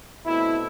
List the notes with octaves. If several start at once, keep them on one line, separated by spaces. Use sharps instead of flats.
B2 A3 C4 E4